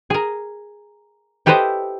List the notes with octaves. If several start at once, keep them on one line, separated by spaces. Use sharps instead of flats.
G#4 A#4
E4 G4 A4 B4 C5 D#5